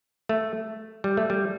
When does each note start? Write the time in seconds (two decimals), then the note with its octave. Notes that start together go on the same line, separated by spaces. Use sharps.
0.29 A3
1.04 G3
1.17 A3
1.30 G3